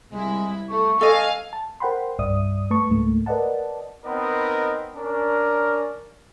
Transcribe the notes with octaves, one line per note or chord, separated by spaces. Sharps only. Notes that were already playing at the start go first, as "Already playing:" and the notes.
C2 G#3 E4
A3 C#6
A4 D#5 F5 G#5
A5
A#4 C5 F#5 G5 B5 C6
C2 G2 D5 E5 D#6
A3 B4 A5 C#6
C#2 G#2 A3 A#3
A#4 B4 D5 D#5 F#5 A5
B3 C4 D#4 A#4 B4 D#5
C#4 D4 A#4